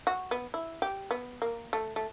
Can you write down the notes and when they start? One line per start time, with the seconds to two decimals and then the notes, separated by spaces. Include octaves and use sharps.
0.07 F#4
0.31 B3
0.54 E4
0.82 G4
1.11 B3
1.42 A#3
1.73 A3
1.96 A3